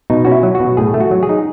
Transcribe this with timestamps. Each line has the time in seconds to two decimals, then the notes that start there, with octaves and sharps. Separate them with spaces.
0.10 B2 D#4
0.25 C#4 F#4
0.32 E4
0.43 F#3
0.55 F#4
0.60 B2
0.77 A2 G#4
0.94 A3
1.00 F#4
1.11 F#3
1.23 G#4
1.29 D#4